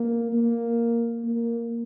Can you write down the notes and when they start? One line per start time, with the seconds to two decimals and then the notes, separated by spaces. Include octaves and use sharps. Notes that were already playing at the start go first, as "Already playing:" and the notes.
Already playing: A#3
0.32 A#3
1.24 A#3